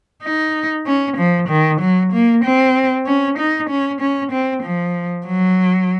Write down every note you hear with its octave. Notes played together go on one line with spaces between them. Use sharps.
D#4
C#4
F3
D#3
F#3
A#3
C4
C#4
D#4
C#4
C#4
C4
F3
F#3